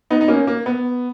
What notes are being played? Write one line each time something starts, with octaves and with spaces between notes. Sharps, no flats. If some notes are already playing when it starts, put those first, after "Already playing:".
B3 D#4
D#4
A#3 C#4
A#3
B3